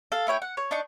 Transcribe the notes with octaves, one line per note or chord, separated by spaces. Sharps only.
A4 F5
A3 E4 C#5 G5
F#5
C#5
D4 D#4 C#6